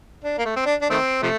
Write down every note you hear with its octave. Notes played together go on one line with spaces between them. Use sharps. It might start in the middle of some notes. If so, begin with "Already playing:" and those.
D4
A#3
A3
C4
D4
D4
D#3 A3 C4
C3 F3 A3